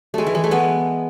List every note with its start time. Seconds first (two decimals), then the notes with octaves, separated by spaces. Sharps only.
0.14 G#3 A3
0.27 E3
0.35 G#3
0.44 A3
0.51 G#3 B3